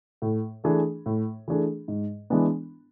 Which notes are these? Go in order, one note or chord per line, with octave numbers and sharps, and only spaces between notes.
A2
E3 A3 D4 G#4
A2
E3 A3 D4 G#4
G#2
E3 G#3 B3 D4